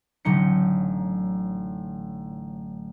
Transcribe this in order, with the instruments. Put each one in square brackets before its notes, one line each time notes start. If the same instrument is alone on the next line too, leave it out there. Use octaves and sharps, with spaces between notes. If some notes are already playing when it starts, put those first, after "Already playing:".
[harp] A1 D3 F#3 D#4 C#7